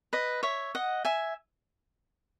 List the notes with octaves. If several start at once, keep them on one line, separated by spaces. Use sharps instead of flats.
B4 D#5
C#5 E5
D#5 F#5
E5 G#5